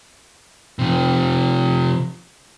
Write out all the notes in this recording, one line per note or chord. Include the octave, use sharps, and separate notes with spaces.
C3 F3